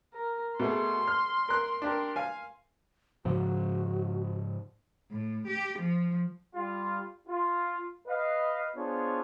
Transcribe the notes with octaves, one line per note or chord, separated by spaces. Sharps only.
A#4
B2 A3 G#4 C6
F6
A#4 F#6
D4 G4 A#4
F5 G#5
G#2 C#3 F3 F#4
A2
G4
F3
G3 F4
F4
B4 D#5 F5
B3 D4 F4 G#4 C5 C#5